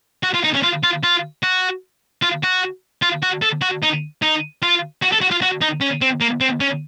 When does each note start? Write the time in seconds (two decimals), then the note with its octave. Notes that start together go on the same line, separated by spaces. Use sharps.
0.23 F#4
0.34 F4
0.44 D#4
0.54 C#4
0.63 F4
0.83 F4
1.03 F4
1.43 F#4
2.22 F4
2.43 F#4
3.02 F4
3.22 F#4
3.42 A4
3.61 F#4
3.83 D#4
4.22 D#4
4.62 F4
5.02 F#4
5.12 A4
5.21 F#4
5.31 F4
5.42 F#4
5.61 D#4
5.81 C#4
6.01 C4
6.20 A#3
6.41 C4
6.60 C#4